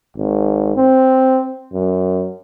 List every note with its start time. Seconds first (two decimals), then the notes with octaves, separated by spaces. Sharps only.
0.17 G#1
0.76 C4
1.73 F#2